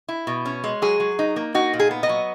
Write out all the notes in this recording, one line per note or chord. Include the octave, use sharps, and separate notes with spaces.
E4
B2
C#4
G#3
F#3 G#4
F#3
D#4
A#3
D#4 F#4
A#2
G#4
B3
D#5
F#3